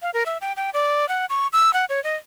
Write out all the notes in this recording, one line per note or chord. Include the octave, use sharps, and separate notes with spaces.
F5
A#4
E5
G5
G5
D5
F#5
C#6
E6
F#5
C#5
D#5